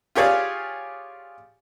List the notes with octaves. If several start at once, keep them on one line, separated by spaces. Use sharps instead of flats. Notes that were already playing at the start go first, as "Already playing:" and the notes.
F4 G4 G#4 C#5 D5 F5